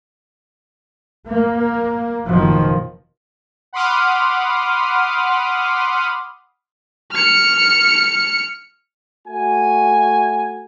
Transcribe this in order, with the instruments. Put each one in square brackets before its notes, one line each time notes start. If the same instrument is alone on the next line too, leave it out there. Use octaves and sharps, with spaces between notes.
[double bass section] A#3
F#1 B2 D#3 F3
[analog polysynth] F#5 B5 C6 D6 D#6 F6
[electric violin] F6 C#7
[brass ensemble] A3 F#4 G#5